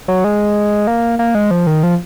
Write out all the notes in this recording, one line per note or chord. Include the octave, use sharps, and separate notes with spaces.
F#3
G#3
A#3
A#3
G#3
F3
D#3
F3